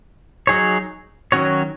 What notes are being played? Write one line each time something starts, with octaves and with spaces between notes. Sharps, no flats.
F#3 D#4 G#4 C#5
D#3 F#3 C#4 F#4 C#5